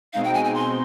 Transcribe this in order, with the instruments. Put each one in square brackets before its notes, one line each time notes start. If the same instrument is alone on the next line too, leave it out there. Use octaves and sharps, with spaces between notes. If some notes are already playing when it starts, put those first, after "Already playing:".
[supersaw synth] B2 G#3 C4 D#4 [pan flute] F5
[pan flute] G5
G#5
G#5
C6